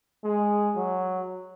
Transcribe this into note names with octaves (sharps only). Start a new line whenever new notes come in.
G#3
F#3